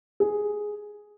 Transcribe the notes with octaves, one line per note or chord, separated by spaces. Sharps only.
G#4